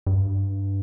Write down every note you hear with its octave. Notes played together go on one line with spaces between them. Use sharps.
G2